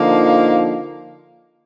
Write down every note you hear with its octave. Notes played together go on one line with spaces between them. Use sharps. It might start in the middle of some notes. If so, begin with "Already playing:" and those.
Already playing: D3 F3 A#3 D#4